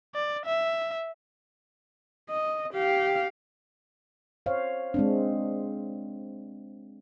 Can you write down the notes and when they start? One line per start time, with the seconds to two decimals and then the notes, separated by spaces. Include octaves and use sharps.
0.15 D5
0.46 E5
2.30 D#5
2.73 G4 F5
4.46 C5 C#5 F5
4.94 G#3 C4 D4